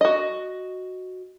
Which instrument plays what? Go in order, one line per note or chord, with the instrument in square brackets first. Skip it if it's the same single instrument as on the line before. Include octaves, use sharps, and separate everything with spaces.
[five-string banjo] F#4 D#5